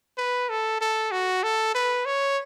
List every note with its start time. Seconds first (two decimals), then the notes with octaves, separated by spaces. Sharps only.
0.18 B4
0.49 A4
0.81 A4
1.11 F#4
1.43 A4
1.74 B4
2.06 C#5